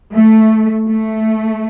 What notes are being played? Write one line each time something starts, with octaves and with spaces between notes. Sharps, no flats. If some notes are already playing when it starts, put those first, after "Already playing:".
A3
A3